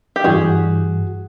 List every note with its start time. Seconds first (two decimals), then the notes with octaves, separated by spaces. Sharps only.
0.16 G4
0.24 G2 E3 G3 F#4 G#4